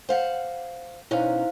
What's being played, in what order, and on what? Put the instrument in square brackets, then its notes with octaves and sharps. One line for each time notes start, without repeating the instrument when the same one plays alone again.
[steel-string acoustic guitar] C5 F5 F#5
[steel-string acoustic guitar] B2 C#4 D#4 [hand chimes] E4 C5 F5